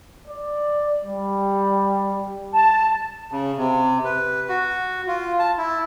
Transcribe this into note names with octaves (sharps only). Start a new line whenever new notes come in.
D5
G3
A5
C#3
C3
B4
F#4
F4
A5
E4